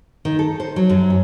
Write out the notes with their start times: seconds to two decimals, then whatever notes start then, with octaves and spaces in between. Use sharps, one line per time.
0.25 D#3
0.39 A4
0.60 C5
0.76 F#3
0.90 F#2
1.10 C#4